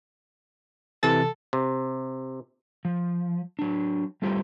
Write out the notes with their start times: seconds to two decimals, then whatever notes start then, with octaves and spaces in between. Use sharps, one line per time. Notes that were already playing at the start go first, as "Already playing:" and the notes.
1.03 C3 E3 A4 A6
1.53 C3
2.85 F3
3.59 F#3 D4
4.22 G3 A3 C4 F4 G4